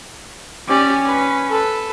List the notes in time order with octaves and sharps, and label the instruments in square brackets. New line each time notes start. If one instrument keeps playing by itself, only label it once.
[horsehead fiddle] C#4 [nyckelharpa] G4 D5
[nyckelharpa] B4
A4 B4